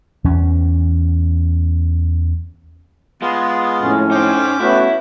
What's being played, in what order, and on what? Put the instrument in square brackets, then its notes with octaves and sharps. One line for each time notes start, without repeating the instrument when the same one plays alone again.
[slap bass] E2 C#4
[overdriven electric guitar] G#3 [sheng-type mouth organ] B3 F4
[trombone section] F2 A2 [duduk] C#4
[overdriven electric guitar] D#4 C5 [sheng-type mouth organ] G5 D6
[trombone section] A3 B3 C#4 [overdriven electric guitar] E4 [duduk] F#4